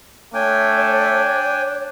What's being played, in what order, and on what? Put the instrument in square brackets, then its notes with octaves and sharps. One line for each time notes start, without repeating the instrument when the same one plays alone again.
[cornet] A3 [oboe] D4 [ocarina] C#5 [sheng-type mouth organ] G5 G#5